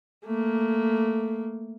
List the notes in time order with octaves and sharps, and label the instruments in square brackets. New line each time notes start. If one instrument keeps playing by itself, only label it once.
[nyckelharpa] A3 A#3